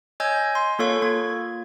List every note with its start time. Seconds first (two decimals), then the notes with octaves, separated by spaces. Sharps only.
0.20 C#5 D#5 G#5 E6 G6 G#6
0.36 G#5
0.55 C6
0.79 A#3 F4 A4 C#5 F5 C#6
1.02 A#3 F4 G#6